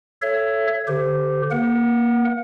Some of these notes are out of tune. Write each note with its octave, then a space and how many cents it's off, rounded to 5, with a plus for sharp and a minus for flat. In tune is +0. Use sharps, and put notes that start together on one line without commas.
A4 +0 C#5 +0 E5 +25
D3 +0 G4 +0 C5 -25
A#3 +10 A#4 +45 F#5 +0